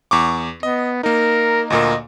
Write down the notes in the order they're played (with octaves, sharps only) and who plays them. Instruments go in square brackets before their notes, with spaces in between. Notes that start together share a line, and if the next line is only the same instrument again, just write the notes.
[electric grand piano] E2 C#6 D6
[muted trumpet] B3 [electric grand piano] D#5
[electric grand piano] A#3 D#4 [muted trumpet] A#4
[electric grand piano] D2 A#2 A#3 [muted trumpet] D#5